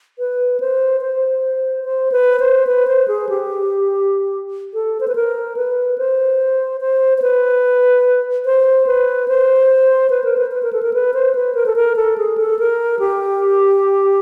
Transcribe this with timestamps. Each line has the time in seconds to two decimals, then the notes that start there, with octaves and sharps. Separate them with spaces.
0.19 B4
0.60 C5
1.01 C5
1.84 C5
2.12 B4
2.40 C5
2.67 B4
2.87 C5
3.08 G#4
3.29 G4
4.74 A4
5.00 C5
5.08 B4
5.15 A#4
5.56 B4
5.98 C5
6.81 C5
7.18 C5
7.22 B4
8.45 C5
8.87 B4
9.28 C5
10.10 B4
10.24 A#4
10.37 B4
10.51 B4
10.63 A#4
10.73 A4
10.83 A#4
10.93 B4
11.14 C5
11.35 B4
11.55 A#4
11.66 A4
11.76 A#4
11.96 A4
12.18 G#4
12.38 A4
12.59 A#4
12.99 G4